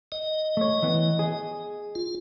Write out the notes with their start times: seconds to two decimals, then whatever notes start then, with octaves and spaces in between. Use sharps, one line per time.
0.12 D#5
0.57 A3 C#5
0.83 E3 B3
1.19 G#4
1.95 F4